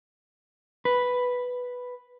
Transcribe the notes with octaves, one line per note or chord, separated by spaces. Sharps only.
B4